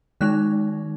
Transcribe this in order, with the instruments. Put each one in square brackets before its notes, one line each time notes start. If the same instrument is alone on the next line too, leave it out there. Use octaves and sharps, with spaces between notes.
[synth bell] D#3 G#3 D#4 F#6